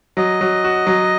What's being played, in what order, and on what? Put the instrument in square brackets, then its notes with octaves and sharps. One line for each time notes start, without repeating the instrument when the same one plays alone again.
[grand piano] F#3 [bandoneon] D#5
[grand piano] F#3
F#4
F#3